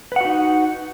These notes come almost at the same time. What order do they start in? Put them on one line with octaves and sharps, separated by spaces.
B4 F#5 F#4 D#4